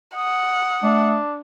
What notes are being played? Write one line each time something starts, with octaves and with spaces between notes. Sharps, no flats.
F#5 D#6
A3 D4